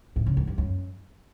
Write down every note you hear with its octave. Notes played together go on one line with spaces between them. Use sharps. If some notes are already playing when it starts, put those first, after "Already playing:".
A2
C#3
G2
G2
F#2